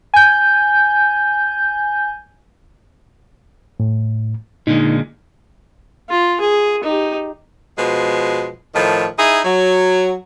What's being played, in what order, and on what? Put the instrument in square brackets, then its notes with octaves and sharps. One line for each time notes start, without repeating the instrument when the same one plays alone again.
[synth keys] G#5 G6
[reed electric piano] A2
[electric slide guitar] A#2 D3 G#3 [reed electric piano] D#4
[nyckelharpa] F4
G#4
D#4 G4
[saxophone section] B2 F3 G#3
A2 D#3 F3
D#4 E4 G#4
F#3